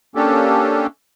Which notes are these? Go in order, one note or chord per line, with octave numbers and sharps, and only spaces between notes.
A#3 C#4 D4 G4 A4